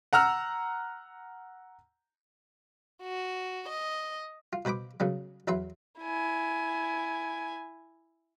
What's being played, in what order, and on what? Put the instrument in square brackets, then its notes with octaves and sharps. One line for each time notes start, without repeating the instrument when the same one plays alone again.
[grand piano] F#5 A#5 E6 F6
[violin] F#4
D#5
[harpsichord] F4
B2 B4 C5 B5 D6
C#3 F#3 B3
E2 F#3 B4 E5 C6
[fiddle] E4 G#5